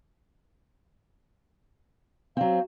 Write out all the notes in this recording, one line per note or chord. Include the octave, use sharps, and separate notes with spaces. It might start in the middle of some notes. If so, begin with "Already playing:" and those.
F#3 C4 F5